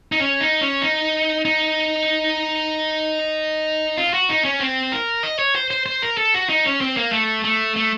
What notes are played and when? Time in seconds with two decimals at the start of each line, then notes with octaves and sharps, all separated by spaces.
0.12 D#4
0.20 C#4
0.41 D#4
0.61 C#4
0.82 D#4
1.45 D#4
3.97 F4
4.14 F#4
4.29 D#4
4.45 C#4
4.60 C4
4.92 A#4
5.23 D#5
5.39 C#5
5.55 C5
5.71 C5
5.86 C5
6.02 A#4
6.17 A4
6.34 F#4
6.50 D#4
6.65 C#4
6.81 C4
6.97 A#3
7.12 A3
7.44 A3
7.76 A3